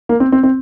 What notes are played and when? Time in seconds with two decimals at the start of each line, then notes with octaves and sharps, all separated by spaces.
0.09 A#3
0.20 C4
0.32 C4
0.43 C4